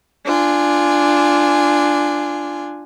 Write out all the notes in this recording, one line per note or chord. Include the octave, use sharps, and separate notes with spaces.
D4 F4 G#5